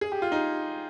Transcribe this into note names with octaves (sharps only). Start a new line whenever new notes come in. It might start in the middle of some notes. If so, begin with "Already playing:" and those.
G#4
G4
F4
D#4